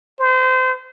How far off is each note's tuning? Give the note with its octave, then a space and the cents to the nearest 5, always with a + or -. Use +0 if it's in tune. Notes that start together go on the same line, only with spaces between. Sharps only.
C5 -30